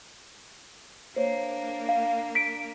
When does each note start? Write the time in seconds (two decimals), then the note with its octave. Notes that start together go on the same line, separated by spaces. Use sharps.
1.16 A#3 D4 C5 C#5
1.89 F5
2.35 B6 D7